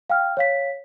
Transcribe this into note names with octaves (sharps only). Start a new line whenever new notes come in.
F5 G5 F6
C#5 F5 B6